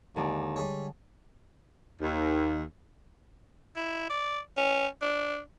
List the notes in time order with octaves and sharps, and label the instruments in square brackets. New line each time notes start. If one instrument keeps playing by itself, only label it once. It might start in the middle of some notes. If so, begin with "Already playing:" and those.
[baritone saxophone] D#2 [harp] D3 G#3 D4
[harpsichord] G3 G#4 C#5
[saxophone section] D#2
[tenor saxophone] E4
D5
C#4
D4